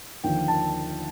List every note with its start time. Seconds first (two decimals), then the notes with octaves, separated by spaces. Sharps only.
0.24 D#2 D3 F3 G5
0.48 A5